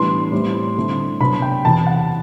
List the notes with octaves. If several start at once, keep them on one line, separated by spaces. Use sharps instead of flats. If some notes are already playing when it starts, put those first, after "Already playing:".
Already playing: A2 E3 G3 B3 D4 C6
A2 G3 C4 E4
D3 A3 C4 E4
C3 F#3 B3 D4 B5
G5
E2 C3 E3 A5
F#5